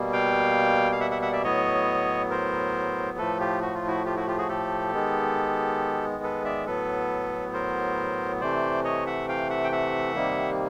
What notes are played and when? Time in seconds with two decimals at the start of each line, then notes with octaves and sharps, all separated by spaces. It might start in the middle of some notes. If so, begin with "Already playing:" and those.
Already playing: B2 G3 A#3
0.13 F5 G5
0.92 F5
1.00 E5 F#5
1.11 E5 F#5
1.22 E5 F#5
1.32 D5 E5
1.44 A2 F#3 B3 C#5 D#5
2.30 A#4 C5
3.18 A2 F3 A3 A4 B4
3.40 F4 G4
3.62 F#4
3.75 F4
3.87 E4 F#4
4.06 F4 G4
4.16 E4 F#4
4.27 F4 G4
4.38 F#4 G#4
4.49 G4 A4
4.93 D#3 G#3 B3
6.23 A4 B4
6.45 D5 E5
6.66 A2 F#3 B3 A4 B4
7.53 A#4 C5
8.41 C3 E3 A3 C5 D5
8.84 C#5 D#5
9.06 E5 F#5
9.28 F5 G5
9.50 E5 F#5
9.64 G5
9.72 E5 F#5
10.15 C3 D#3 G3 A#3